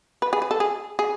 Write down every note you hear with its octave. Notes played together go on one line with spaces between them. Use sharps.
B4
G#4
B4
A4
G#4
G#4